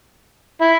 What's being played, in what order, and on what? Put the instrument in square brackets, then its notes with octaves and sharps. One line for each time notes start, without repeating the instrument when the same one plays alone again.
[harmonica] E4